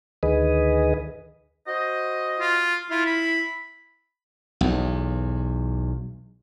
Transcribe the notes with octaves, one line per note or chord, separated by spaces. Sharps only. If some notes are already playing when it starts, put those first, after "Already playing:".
D2 D#3 G#4 B4 D#5
F#4 C5 D#5
F4
E4 F4
B5
B1 E2